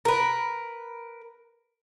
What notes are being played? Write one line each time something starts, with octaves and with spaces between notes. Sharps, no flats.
A#4 B4